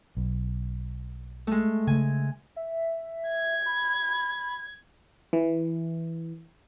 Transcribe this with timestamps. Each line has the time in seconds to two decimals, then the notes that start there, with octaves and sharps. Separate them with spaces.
0.17 B1
1.47 G#3 A3
1.87 C#3 A3 G#5
2.56 E5
3.29 G#6
3.66 B5
5.33 E3